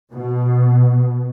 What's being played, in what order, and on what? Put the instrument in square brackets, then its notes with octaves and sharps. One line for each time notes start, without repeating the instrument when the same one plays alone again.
[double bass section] B2